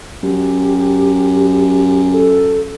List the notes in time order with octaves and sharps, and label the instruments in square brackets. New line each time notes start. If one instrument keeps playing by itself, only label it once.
[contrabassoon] F#2 [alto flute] G4
[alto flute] A4